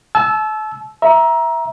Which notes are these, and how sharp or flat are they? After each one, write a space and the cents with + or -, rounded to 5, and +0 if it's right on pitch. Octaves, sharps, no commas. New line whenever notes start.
A5 -35 E6 +0
E5 -5 A#5 +20